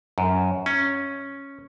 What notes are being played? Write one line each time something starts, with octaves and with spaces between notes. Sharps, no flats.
F#2
C#4